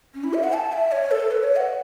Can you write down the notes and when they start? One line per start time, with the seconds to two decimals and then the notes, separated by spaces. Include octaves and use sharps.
0.14 C#4
0.24 E4
0.34 E5
0.43 F#5
0.53 A5
0.72 E5
0.92 C#5
1.11 A4
1.31 B4
1.43 C#5
1.56 F#5